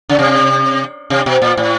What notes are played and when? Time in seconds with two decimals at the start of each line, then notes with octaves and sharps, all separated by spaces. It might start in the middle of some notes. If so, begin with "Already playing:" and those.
0.09 C#3
0.19 C3
1.10 C3
1.26 B2
1.42 A#2
1.57 A2